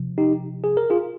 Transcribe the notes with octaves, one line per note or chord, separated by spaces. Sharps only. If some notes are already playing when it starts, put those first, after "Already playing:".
Already playing: C3 F3
D#4 G4
G#4
A#4
F4 G#4